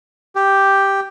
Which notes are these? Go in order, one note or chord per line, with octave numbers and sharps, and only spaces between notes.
G4